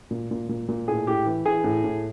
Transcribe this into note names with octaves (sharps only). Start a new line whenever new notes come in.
A#2
A#2
A#2
A#2
A2 G#4
A2 G4
E3
E3 G#4
A2
A2